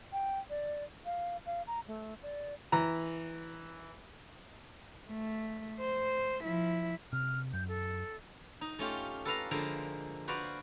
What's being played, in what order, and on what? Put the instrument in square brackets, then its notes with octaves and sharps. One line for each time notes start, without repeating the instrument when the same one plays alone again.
[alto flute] G5
D5
F5
F5
A#5
A3
D5
[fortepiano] E3 A#5
[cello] A3
C5
F3 E4
[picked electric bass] C3 [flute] F6
[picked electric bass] F#2 [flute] G6
[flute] A4
[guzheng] D#4
A3 C#4 F4 G4
A4 B4 F5 A#5
D3 F3 G#3 A#3
F#4 B4 C5 D5 F5